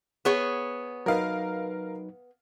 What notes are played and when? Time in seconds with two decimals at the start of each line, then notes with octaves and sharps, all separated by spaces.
0.25 B3 G#4 C#5
1.06 F#3 D#4 A#4 B4 F5